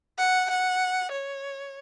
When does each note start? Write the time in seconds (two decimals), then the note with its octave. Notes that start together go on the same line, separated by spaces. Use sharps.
0.18 F#5
0.50 F#5
1.12 C#5